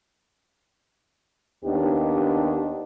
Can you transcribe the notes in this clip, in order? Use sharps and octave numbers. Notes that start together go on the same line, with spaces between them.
D#2 B3 D4 D#4 G4